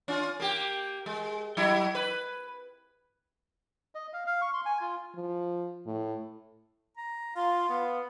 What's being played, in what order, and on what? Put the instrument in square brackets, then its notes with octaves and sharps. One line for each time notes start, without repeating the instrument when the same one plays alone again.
[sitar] C#4 F4
A#3 G4
G#3
F#3 E4
B4
[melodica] D#5
F5
F5
C#6
C6
G#5
F4
[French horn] F3
A2
[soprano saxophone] A#5
[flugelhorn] F4 [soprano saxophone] F5 [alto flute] C6
[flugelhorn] B3